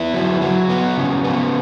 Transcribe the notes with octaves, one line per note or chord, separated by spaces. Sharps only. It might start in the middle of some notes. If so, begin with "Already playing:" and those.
Already playing: B3 E4
F#3
F#3
B3
C#3
B3